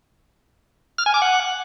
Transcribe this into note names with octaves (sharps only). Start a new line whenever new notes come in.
F6
G#5
D6
F#5